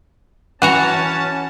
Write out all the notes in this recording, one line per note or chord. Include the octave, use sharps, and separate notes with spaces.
E3 C#4 F#4 F#5 A5 A#5